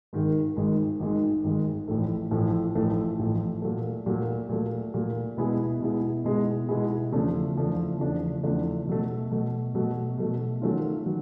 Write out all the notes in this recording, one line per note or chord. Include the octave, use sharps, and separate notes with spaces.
G#1 G#2 D#3 G#3
G#1 G#2 D#3 G#3
G#1 G#2 D#3 G#3
G#1 G#2 D#3 G#3
A1 A2 F3 A3
A1 A2 F3 A3
A1 A2 F3 A3
A1 A2 F3 A3
A#2 F#3 A3
A#2 F#3 A3
A#2 F#3 A3
A#2 F#3 A3
B2 G#3 B3 E4 G#4
B2 G#3 B3 E4 G#4
B2 G#3 B3 E4 G#4
B2 G#3 B3 E4 G#4
E2 C#3 F3 A3 D4
E2 C#3 F3 A3 D4
E2 C#3 F3 A3 D4
E2 C#3 F3 A3 D4
B2 F#3 A3
B2 F#3 A3
B2 F#3 A3
B2 F#3 A3
D#3 F#3 A3 C#4 F4
D#3 F#3